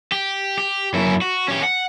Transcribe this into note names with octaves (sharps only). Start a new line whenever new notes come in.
G4
G4
F#2 E4
F#4
C#4 G4
F#5